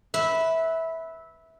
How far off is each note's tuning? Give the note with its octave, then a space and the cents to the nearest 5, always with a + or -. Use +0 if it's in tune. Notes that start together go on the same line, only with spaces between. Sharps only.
B4 +0 E5 -15